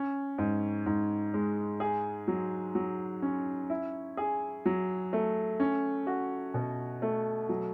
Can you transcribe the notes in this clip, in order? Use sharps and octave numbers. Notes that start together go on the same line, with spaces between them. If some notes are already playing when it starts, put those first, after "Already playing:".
Already playing: C#4
G#2
G#2
G#3
G#4
F#3
F#3
C#4
E4
G#4
F#3
A3
C#4
F#4
B2
A3
F#3